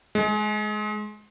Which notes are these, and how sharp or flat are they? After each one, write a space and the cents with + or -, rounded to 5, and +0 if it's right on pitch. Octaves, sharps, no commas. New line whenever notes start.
G#3 +25